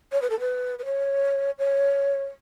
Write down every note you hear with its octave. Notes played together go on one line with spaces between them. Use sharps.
C#5
B4
A4
B4
B4
C#5
C#5